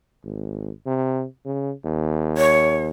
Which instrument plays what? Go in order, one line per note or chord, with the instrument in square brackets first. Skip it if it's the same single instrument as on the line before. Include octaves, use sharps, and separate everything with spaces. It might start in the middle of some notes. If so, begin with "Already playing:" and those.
[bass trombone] G#1
C3
C#3
D#2
[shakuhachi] C#5